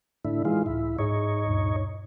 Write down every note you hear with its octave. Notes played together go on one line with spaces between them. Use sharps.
A2 D3 E4
E3 G#3 D#4 F4
C#2 A2 E4
G#2 D#4 G#4 C#5 D#5
D2 G2 A#2